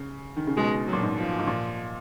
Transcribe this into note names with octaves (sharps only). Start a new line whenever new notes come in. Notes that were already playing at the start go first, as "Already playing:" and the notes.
Already playing: C#3
D#3
C#3
B2 G#3
F#3
A#2
G#2
F3
G#2
A#2